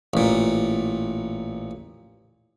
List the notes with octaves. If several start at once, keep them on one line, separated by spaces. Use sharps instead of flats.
A1 A#2